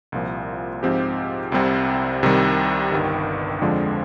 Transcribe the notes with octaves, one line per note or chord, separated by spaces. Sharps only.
C2 A#2 F3
G#2 F3 C4 G4
C2 C3 G3 C4
C2 C3 D#3 G3
G1 G2 D#3
F2 D3 F3 G#3 D4